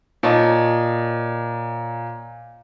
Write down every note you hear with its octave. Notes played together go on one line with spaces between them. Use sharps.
A#2 C#5 D#5 A5